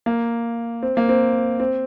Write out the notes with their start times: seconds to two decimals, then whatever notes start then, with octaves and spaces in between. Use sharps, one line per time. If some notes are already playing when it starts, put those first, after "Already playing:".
0.06 A#3
0.83 C4
0.97 A#3
1.09 C4
1.60 C4